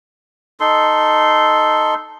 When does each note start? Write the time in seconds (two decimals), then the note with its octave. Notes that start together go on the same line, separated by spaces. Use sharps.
0.60 D#4 A4 C6